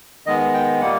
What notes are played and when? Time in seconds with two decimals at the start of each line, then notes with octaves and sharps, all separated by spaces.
0.26 D#3 G#3 B3 D#5
0.54 G5
0.81 A#2 G3 A#3 F#5